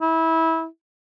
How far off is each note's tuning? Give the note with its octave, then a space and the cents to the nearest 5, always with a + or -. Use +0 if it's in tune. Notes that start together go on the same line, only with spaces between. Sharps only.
E4 -20